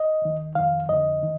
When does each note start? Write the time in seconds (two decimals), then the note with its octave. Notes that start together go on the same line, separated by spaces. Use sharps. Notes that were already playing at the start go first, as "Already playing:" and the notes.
Already playing: D#5
0.22 D#2 D#3
0.55 F2 D#3 F5
0.89 F2 D3 D#5
1.23 D#3